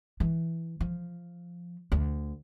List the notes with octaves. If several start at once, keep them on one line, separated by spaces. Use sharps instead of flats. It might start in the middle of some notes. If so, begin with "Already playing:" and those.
E3
F3
D2